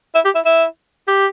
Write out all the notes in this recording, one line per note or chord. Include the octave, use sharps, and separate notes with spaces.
E4
G4
E4
E4
G4